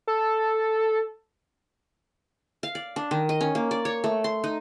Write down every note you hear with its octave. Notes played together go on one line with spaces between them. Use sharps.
A4
F5
D5
D4
D#3
D#5
C#4
A#3
D5
C#5
A3
C6
D#4